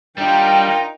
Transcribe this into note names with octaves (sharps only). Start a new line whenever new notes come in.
G3 D4 D#4 F4 A#4 G5